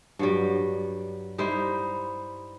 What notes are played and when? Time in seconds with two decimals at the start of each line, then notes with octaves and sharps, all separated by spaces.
0.19 G2 F#3 G3
1.38 G3 D#4 E4 C5